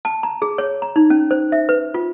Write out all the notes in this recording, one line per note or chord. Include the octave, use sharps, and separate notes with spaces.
A5
A#5
G#4
C#5
A#5
D#4
C#4
C5
E5
B4
F4